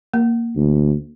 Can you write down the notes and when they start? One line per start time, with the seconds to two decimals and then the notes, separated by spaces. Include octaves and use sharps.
0.14 A#3
0.56 D2